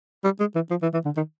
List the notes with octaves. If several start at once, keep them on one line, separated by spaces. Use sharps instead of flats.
G3
G#3
E3
F3
E3
E3
D3
D#3